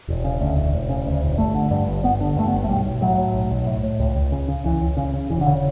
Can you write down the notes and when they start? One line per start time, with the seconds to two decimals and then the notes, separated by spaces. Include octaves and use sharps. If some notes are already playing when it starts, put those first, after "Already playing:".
0.08 E1
0.24 C#3
0.41 D2
0.57 E1
0.73 E1
0.89 C#3
1.06 D2
1.22 E1
1.38 G1 A3
1.55 D3
1.71 G2
1.88 G1
2.03 G1 B3
2.21 D3
2.36 G2 A3
2.48 B3
2.53 G1
2.64 A3
2.68 B1 G3
2.85 B1
3.01 A2 F#3
3.18 A2
3.34 B1
3.51 B1
3.66 A2
3.83 A2
3.99 C#2
4.15 C#2
4.32 C#3
4.48 C#3
4.65 C#2 E3
4.81 C#2
4.97 C#3
5.14 C#3
5.30 E1 E3
5.41 D3
5.46 C#3